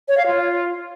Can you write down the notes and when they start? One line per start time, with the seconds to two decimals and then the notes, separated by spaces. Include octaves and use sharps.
0.08 C#5
0.17 F5
0.26 F4